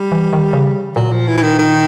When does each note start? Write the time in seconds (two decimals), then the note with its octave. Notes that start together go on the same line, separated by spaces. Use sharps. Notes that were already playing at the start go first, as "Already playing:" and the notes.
Already playing: G3
0.12 E3
0.33 D#3
0.53 C#3
0.96 A#2 F#3
1.12 F3
1.27 E3
1.38 E3
1.43 D#3
1.59 D#3